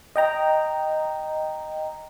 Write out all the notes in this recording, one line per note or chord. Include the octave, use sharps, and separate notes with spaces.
D#5 G5 A#5